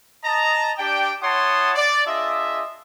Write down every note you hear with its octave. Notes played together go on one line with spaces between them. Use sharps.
D#5 A5 A#5
D4 G4 D5 G5
E4 C#5 F#5 A5 C6 D#6
D5
D4 F4 G#4 D#5 E5